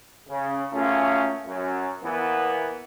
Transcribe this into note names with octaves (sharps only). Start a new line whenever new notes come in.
C#3
A3 A#3 C#4 F4 F#4 G#4
F#2
E2 E3 A#3 B3